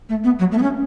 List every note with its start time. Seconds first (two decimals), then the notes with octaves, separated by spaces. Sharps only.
0.09 A3
0.24 B3
0.39 F#3
0.52 A3
0.58 B3
0.62 C#4